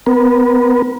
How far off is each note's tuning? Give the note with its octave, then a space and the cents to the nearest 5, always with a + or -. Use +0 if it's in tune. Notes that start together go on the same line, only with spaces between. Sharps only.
B3 +30 A#4 +40